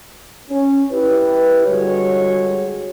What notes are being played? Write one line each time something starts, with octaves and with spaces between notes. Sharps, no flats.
C#4
E4 G4 B4
D3 G3 G#3 F#4 C#5